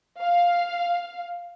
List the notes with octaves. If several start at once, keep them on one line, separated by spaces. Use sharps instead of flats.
F5